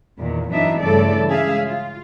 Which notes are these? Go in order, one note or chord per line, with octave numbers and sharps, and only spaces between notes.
E2 A#2 D#3
F#2 E3 B3 D4 D#4 E5
G2 C#3 E3 A3 A4 D5
C#3 G#3 G#4 E5 F5
F4